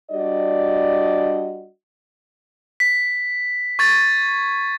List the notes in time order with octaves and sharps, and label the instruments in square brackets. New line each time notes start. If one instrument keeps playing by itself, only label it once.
[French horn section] G3 D4 F#4 D5 D#5
[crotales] B6
C#6 G#6 A6